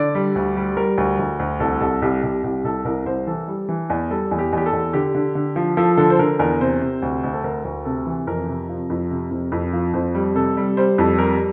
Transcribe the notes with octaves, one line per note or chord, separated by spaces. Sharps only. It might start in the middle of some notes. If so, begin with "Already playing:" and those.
Already playing: D3 D5
G3
D2
G3
G3 A#4
D2
D2
D2
C2 A4
C2 A4
C2 G4
C2 G4
C2 G4
C2 A4
C2 A#4
C2 C5
E3 A4
G3
E3
E2
G3 A4
E2
G4
E2 G4
A4
E2
D3 G4
D3
D3
F3
F3 A4
D3 A4
C5
D3 A#4
E2 A#4
C3 C5
C3
D2
D2
A4
D2 A#4
D2
C3 A4
E3
F2 A#4
C3
F3
F2
C3
F2
F2
F3
F2 C5
G3
C3 A4
G3
G3 C5
F2 A4
G3 A#4